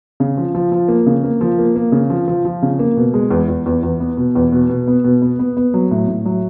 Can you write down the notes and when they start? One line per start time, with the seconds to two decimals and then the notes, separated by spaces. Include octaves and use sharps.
0.20 C#3
0.37 F3
0.55 F3
0.72 F3
0.88 A#3
1.06 C#3
1.24 A#3
1.41 F3
1.59 A#3
1.76 A#3
1.92 C#3
2.10 F3
2.28 F3
2.45 F3
2.62 C#3
2.79 A#3
2.97 B2
3.14 G#3
3.31 E2
3.48 E2
3.66 E2
3.83 E2
4.00 B3
4.17 B2
4.35 E2
4.52 B2
4.69 B2
4.87 B3
5.04 B2
5.22 B3
5.39 B3
5.57 B3
5.74 F#3
5.91 A2
6.08 A2
6.26 F#3